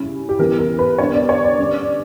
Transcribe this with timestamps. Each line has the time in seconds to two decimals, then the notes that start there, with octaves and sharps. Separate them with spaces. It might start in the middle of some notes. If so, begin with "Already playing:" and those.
Already playing: C#3 G3 C#4 E4
0.29 G4
0.39 E3 G3 B3 E4 A#4
0.58 A#4
0.79 B4
0.98 D3 G3 B3 D4 C#5
1.14 D5
1.29 C#5
1.44 D5
1.59 D3 G3 C#4